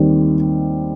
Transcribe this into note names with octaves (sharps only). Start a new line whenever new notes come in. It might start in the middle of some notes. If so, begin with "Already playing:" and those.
Already playing: D#2 D#3 G3 C4